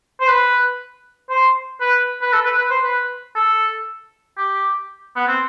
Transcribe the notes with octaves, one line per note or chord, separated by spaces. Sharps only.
C5
B4
C5
B4
B4
A4
B4
B4
C5
B4
A4
G4
B3
C4